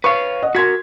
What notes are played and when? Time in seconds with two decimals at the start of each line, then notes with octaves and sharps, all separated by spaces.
0.04 B4 C#5 F5 C#6
0.43 D#5 F#5
0.55 F#4 A#4 C6 G#6 B6